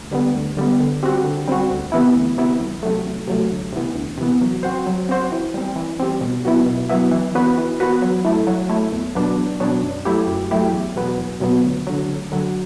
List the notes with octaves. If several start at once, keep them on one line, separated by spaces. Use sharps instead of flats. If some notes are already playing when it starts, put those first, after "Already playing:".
Already playing: D2
D3 G3 B3
D2
D3 G3 B3
D3
G3 C4 F#4
D3
G3 C4 F#4
D2
C3 E3 B3 E4
D2
C3 E3 B3 E4
C2
C3 F#3 A3
C2
C3 F#3 A3
D2
C3 E3 B3
D2
C3 E3 B3
F#3
C4 F#4 C5
F#3
C4 F#4 C5
E3
G3 C4
E3
G3 C4
B2
F#3 B3 E4
B2
F#3 B3 E4
E3
B3 F#4 B4
E3
B3 F#4 B4
F#3
A3 E4
F#3
A3 E4
E2
B2 F#3 B3 D4
E2
B2 F#3 B3 D4
F#2
F#3 A3 E4 G4
F#2
F#3 A3 E4 G4
E2
B2 F#3 B3
E2
B2 F#3 B3
D2
D3 F#3
D2
D3 F#3